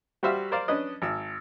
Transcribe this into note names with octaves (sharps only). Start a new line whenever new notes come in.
G3 F#4 G4 C5 E5 F5
A#4 C5 D5 F5
C#4 D4 B4 D#5
G#1 E6